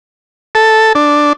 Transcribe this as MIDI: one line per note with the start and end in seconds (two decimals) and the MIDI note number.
0.55 0.93 69
0.95 1.33 62